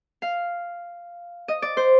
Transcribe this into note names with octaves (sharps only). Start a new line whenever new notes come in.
F5
D#5
D5
C5